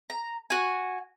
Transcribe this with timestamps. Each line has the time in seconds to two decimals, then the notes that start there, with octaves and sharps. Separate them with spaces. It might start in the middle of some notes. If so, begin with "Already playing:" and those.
0.10 A#5
0.50 F#4 G#5